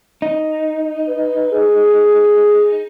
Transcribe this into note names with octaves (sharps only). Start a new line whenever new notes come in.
D#4
B4
G#4